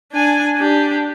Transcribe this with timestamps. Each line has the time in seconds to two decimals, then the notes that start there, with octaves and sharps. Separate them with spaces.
0.12 D4 G#5
0.57 D4 G4